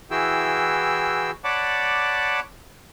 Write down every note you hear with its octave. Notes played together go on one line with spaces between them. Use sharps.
E3 E4 F#4 G#4 G5 E6
C#5 D5 F#5 A5 B5 D6